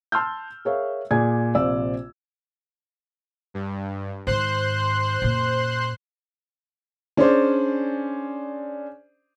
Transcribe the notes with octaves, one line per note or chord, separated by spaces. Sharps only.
A5 C6 E6 F6 G6
G#4 A#4 C#5 E5 F5
A#2 G#4 D5 G#5 G#6
A#1 C3 D5 F5 E6
G2
G#2 D#3 C5 C6 F#6
F#2 A#2
C#4 D4 G#4 C5 D5